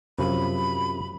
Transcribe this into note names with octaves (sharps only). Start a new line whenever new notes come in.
F#2 C3 F3 B5